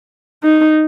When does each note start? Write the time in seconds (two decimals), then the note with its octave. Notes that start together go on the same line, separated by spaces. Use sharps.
0.43 D#4